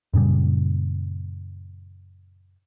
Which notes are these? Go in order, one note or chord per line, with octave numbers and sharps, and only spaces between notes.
F#2 A#2 C#3 G3